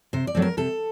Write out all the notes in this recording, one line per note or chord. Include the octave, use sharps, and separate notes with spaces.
C3 C5
D5
F#3 A3 C4
A#4
C3 A4